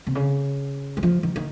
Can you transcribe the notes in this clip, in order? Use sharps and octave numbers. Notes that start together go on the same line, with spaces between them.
C3
C#3
F#3
F3
D#3
D#3